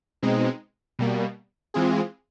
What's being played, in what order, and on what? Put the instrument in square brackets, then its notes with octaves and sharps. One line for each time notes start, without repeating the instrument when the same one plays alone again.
[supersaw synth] B2 G#3 C4 D#4
B2 G3 A#3
E3 G#3 C4 F4 G#4